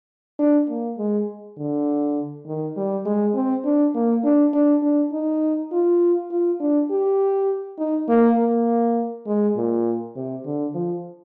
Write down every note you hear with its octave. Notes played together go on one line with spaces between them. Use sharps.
D4
A#3
G#3
D3
D#3
G3
G#3
C4
D4
A#3
D4
D4
D4
D#4
F4
F4
D4
G4
D#4
A#3
A#3
G#3
A#2
C3
D3
F3